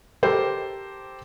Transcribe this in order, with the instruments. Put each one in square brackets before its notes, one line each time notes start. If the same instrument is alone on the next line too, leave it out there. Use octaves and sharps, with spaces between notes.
[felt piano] G4 A4 A#4 C5